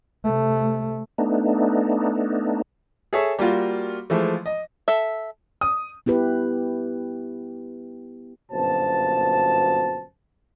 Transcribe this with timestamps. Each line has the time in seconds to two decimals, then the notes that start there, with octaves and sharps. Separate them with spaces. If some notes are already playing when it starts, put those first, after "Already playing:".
0.24 C3 A3
1.18 A3 B3 D4 D#4
3.13 G#4 A4 C#5 E5
3.39 G3 A#3 F4 F#4
4.10 E3 F3 G#3 A3
4.46 D#5
4.88 A4 E5
5.61 D#6
6.06 B3 E4 G4 B4
8.52 G1 F#2 B2 A#3 C5 A5